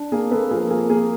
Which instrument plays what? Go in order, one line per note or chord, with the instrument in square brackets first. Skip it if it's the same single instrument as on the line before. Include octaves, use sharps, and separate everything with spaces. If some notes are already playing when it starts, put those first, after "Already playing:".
Already playing: [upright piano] D4
A#3 G#4
A#3 A4 B4
F3 G#4 A#4
A#3 G#4
A#3 G#4